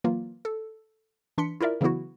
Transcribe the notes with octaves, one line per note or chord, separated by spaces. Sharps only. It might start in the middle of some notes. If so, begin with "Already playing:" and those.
E3 F#3 A#3 F4
A4
E3 D4 C6 B6 C#7
E4 F4 A#4 D5 E5
C#3 E3 F#3 B3 E4 F#4